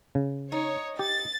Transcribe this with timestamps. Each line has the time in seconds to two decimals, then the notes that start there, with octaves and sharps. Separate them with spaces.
0.15 C#3
0.52 D#4 C#5
0.99 G4 A6